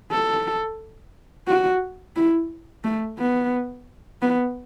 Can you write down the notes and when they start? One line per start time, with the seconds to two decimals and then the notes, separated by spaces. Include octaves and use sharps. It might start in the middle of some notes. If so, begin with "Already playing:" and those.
0.12 A4
1.48 F#4
2.16 E4
2.84 A3
3.19 B3
4.22 B3